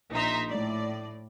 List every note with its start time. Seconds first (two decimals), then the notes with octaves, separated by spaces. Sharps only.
0.12 A#1 D#4 E5 A#5 C6
0.49 A2 D5